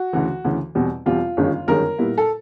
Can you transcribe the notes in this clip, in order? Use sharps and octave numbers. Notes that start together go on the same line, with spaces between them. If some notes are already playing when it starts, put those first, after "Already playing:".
Already playing: F#4
D2 C#3 E3
D2 C#3 E3
E2 B2 G3 C4
E2 B2 G3 C4 F4
G1 F#2 D#3 G#3 C#4
G1 F#2 D#3 G#3 C#4 A#4
A#2 G3 B3 E4
A4